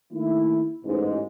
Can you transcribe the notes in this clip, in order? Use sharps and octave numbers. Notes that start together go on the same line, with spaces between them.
D#3 A3 A#3 D#4 E4
A1 G#2